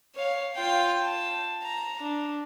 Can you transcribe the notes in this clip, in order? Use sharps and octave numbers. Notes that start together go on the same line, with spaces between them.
C#5 F5
F4 G5
A5
A#5
D4